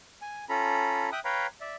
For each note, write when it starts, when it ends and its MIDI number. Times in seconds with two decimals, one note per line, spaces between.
0.22 0.45 80
0.49 1.10 61
0.49 1.10 65
0.49 1.10 69
0.49 1.10 82
0.49 1.10 83
1.12 1.20 76
1.12 1.20 79
1.12 1.20 87
1.12 1.20 90
1.25 1.47 71
1.25 1.47 73
1.25 1.47 77
1.25 1.47 79
1.25 1.47 82
1.25 1.47 83
1.61 1.76 74
1.61 1.76 76